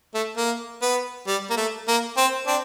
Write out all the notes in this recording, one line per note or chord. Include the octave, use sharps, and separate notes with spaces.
A3
A#3
B3
G3
A#3
A3
A#3
C4
C4 D4